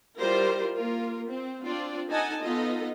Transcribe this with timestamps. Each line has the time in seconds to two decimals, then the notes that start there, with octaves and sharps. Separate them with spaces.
0.18 G3 E4 F4 A#4 C5
0.73 A#3 F4 A#4
1.26 C4
1.62 C4 D4 F4 D5
2.09 D#4 A4 D#5 F#5 G#5 A5
2.40 B3 D#4 F4 A4 D#5